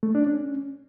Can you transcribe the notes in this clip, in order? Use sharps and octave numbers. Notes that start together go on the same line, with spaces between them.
A3
D4
C#4